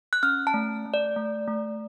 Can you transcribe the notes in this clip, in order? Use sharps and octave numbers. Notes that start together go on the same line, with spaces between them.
F#6
C#4 F6
A5
A3
A3
D5
A3
A3